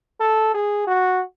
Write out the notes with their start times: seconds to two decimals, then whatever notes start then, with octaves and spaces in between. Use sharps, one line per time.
0.21 A4
0.55 G#4
0.87 F#4